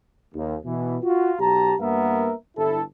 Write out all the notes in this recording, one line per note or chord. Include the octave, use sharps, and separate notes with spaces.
D#2
B2 E3
F4 F#4
B1 G4 A5 A#5
G2 A#3 B3 A#4 E5 F#5
G1 E4 A4